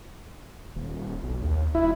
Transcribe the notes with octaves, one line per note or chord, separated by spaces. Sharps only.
D#1
B1
D#2
E1 E4